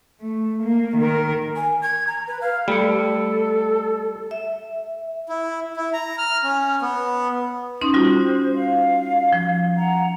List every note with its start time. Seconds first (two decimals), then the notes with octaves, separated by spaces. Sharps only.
0.21 A3
0.64 A#3
0.97 D#3 A#4
1.56 G#5
1.82 G#6
2.07 A#5
2.28 B4
2.41 F5
2.68 G3 A3 A4 C#7
4.31 E5
5.29 E4
5.77 E4
5.93 A#5
6.18 F6
6.44 C#4
6.82 B3
7.81 C#4 D#4 C6
7.94 G3 F4 F#4 C5
8.55 F5
9.33 F3
9.75 F#5 A#5